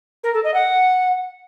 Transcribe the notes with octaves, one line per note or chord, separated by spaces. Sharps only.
A#4
A4
D#5
F#5